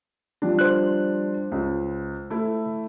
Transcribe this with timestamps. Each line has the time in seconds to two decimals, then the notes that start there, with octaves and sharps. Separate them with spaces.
0.42 F3 G3 D4
0.59 C5 F#6
1.52 C#2
2.30 A3 E4